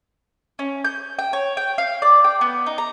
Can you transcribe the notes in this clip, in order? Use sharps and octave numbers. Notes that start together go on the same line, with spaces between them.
C#4
G6
G5
C#5
G5
F5
D5
G5
B3
D#4
A#5